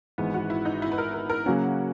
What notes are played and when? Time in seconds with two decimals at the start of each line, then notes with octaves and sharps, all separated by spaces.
0.18 G#1 G#2 E3 B3
0.34 F#4
0.50 E4
0.65 D#4
0.82 E4
0.92 B4
0.98 A#4
1.14 A#4
1.29 A#4
1.46 C#3 F#3 A#3 C#4 F#4